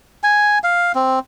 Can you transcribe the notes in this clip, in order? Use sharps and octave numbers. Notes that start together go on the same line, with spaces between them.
G#5
F5
C4